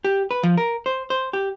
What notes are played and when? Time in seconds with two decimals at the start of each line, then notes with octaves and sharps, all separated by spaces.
0.05 G4
0.31 B4
0.43 F3
0.57 A#4
0.86 C5
1.10 C5
1.33 G4